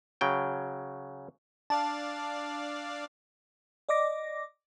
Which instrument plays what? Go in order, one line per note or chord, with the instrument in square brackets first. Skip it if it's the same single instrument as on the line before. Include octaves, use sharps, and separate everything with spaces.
[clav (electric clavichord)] C#3 F#3 G5
[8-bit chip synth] D4 D5 F5 [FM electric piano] A5
[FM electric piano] D5 D#5 D6 A#6